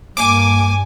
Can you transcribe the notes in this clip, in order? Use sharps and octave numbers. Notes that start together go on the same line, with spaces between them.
G2 A#3 G#5 D6